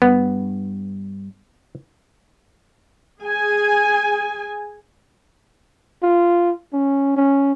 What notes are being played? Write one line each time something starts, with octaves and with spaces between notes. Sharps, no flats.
G2 B3
G#4 G#5
F4
C#4
C#4